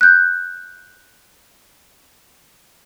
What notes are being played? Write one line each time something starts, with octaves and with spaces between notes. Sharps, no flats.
F#6 G6